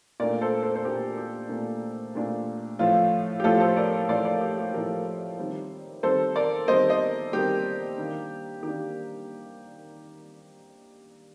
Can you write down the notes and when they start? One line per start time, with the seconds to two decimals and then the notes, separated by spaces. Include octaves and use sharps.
0.20 A#2 A3 D4 A#4 D5
0.41 A4 C5
0.63 A4 C5
0.75 C5
0.85 A#2 A3 D4 G4 A#4
1.17 G4
1.49 A#2 A3 D4
2.15 A#2 A3 D4
2.79 A2 F3 A3 F4
3.40 G4
3.44 A2 F3 A3 F4 A4
3.60 A4 C5
3.77 A#4 D5
4.08 A2 F3 A3 D5 F5
4.25 A#4 D5
4.41 G4
4.58 G4
4.73 A2 F3 A3 G4 A#4
5.38 D#3 G3 C4
6.03 D#3 G3 C4 A4 C5
6.36 A#4 D5
6.68 D#3 G3 C4 C5 D#5
6.89 C5 D#5
7.33 D#3 G3 C4 G4 A#4
7.98 D#3 A#3 D4
8.62 D#3 A#3 D4 G4